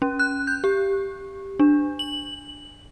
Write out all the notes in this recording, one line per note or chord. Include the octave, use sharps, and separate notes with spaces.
C#4
F#6
G6
G4
D4
F#7